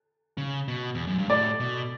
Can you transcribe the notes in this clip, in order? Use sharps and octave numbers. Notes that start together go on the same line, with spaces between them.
C#3
B2
E2
F#2
G2
A2 D5
B2